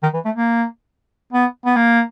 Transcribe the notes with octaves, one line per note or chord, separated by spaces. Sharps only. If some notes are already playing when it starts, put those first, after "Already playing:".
D#3
E3
A3
A#3
B3
B3
A#3